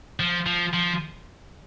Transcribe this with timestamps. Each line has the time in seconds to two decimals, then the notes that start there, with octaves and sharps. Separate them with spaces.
0.20 F3
0.46 F3
0.73 F3